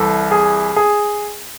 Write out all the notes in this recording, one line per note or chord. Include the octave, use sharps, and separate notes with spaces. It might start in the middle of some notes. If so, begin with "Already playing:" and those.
Already playing: C2 E3 A4
G#4
G#4